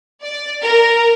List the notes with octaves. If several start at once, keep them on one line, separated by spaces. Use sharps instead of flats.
D5
A#4